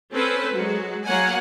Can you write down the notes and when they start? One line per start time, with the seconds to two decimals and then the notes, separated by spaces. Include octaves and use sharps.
0.14 C4 C#4 A4 B4 C5
0.52 F#3 G#3 F#4
1.06 F#3 A#3 C#5 F#5 G#5